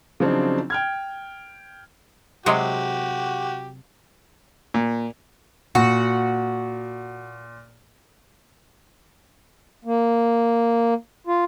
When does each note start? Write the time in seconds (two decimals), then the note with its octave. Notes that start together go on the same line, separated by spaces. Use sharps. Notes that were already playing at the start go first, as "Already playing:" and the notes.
0.20 C#3 F3 F#3 C4 D4 D#4
0.70 G5 F6 G#6
2.46 C3 F#3 G#3 F#4 G4
4.74 A#2
5.75 A#2 F#4
9.85 A#3
11.27 F4